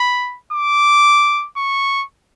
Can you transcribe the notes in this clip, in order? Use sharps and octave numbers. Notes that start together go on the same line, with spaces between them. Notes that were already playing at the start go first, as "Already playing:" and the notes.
Already playing: B5
D6
C#6